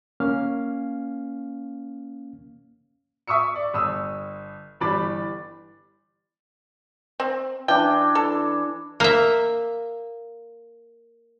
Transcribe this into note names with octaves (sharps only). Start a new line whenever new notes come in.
A#3 C#4 F5 F6
E5 C#6 D#6 E6 C#7
D5
G1 D#6 E6
G1 E3 G3 B5 D6 A6
C4
E3 D4 G5
A4
A#3 E5